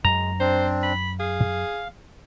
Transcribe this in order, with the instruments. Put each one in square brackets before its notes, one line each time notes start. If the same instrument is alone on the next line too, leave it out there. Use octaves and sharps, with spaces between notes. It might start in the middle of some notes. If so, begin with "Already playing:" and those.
[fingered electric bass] F#2 [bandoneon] G#3 [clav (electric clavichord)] A#5
[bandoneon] C4 D4 [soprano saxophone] C5
[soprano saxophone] B5
[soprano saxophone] G#4 [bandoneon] F5